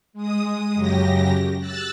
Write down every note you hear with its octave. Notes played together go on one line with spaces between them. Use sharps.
G#3 D#6
F#2 C#3 F#3 G4 A#6
E6 F#6 A6